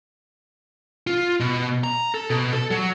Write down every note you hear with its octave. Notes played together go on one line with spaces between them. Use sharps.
F4
B2
A#5
A4
B2
A4
F#3